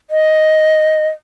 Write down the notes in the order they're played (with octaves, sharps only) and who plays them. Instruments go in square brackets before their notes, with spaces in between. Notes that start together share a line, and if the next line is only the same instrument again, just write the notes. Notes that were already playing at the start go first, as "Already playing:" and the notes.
[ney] D#5